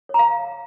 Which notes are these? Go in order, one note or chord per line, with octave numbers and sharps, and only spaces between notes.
C#5 F5 A#5